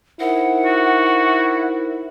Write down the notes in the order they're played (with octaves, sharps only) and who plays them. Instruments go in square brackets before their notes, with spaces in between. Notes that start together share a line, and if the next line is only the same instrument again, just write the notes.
[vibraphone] D#4 A#4 C5 [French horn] E4 [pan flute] F#5
[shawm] F#4